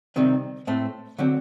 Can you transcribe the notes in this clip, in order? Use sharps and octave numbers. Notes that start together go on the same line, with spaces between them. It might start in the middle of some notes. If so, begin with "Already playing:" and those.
C3 D#3 G3 C4
A2 A3 C4
D3 F#3 C4